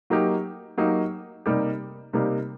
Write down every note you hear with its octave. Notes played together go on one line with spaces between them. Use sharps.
F#3 A#3 D#4 G4
F#3 A#3 D#4 G4
C3 G3 A#3 D#4 G4
C3 G3 A#3 D#4 G4